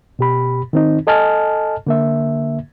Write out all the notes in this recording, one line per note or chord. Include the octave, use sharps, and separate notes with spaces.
B2 G4 B5
D#3 C4 D#4
A4 D#5 G#5 A5 F6
D3 A#3 E5